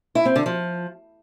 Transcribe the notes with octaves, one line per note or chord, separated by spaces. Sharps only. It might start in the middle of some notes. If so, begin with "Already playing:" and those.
E4
C4
D3
F3